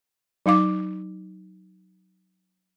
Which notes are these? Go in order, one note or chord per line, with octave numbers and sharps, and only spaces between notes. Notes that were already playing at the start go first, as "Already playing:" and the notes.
F#3 D#4 F5 D6